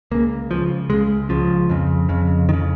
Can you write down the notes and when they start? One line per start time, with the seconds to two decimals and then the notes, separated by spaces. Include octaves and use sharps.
0.11 C#2 C#3 A#3
0.51 C#2 C#3 F3
0.90 C#2 C#3 G#3
1.29 C#2 C#3 F3
1.70 F2 C#3
2.09 F2 C#3
2.49 F2 D#3
2.53 C#3